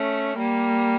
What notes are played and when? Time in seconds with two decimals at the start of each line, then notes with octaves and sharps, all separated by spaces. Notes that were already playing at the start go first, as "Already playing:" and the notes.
Already playing: A3 C#4
0.37 G3 A#3